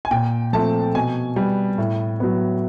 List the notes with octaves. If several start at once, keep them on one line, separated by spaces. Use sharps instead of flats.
G#5
A#2 G5
F3 A3 C4 A5
B2 G#5
G3 B3
A2
F#3 B3